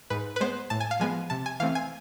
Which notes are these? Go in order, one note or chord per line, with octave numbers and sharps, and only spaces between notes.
G#2 B4
B4
G#3 B3 C5
A2 A5
G#5
F5
F3 G#3 B3 G#5
C3 A5
G#5
E3 A3 C4 F5
G#5